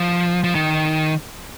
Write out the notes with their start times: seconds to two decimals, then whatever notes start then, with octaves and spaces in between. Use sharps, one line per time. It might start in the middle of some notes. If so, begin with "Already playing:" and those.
Already playing: F3
0.44 F3
0.55 D#3